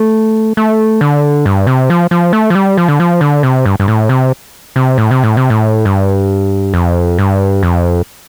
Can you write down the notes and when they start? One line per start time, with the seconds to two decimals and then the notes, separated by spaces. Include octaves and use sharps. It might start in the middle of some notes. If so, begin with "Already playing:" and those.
Already playing: A3
0.57 A3
1.01 D3
1.46 G2
1.67 C3
1.90 F3
2.11 F3
2.33 A3
2.50 F3
2.55 G3
2.77 F3
2.88 D3
3.00 F3
3.21 D3
3.43 C3
3.66 G2
3.80 G2
3.88 A2
4.09 C3
4.76 C3
4.98 A2
5.11 C3
5.23 A2
5.37 C3
5.50 A2
5.85 G2
6.74 F2
7.19 G2
7.63 F2